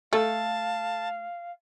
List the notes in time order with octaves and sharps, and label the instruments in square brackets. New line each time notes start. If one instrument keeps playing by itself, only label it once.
[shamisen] A3 [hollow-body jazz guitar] A4 [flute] F5 [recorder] A5